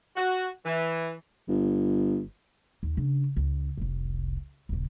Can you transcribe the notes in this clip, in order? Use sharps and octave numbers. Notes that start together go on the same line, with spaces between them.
F#4
E3
G1
D#2
C#3 D4
C#2
F1 C2
D#1 C#3